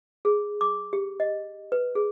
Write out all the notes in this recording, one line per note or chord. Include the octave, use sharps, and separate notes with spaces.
G#4
D6
G4
D#5
B4
G#4